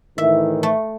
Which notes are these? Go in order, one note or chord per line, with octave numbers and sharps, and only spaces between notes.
A2 D#3 E3 E5
A3